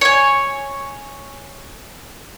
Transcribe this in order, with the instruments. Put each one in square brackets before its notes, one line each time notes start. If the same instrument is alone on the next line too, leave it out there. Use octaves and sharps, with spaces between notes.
[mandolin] C#5 G#5